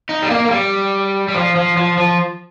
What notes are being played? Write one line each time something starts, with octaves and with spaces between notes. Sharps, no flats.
D#4
G3
A#3
A#3
G3
G3
F3
F3
F3
F3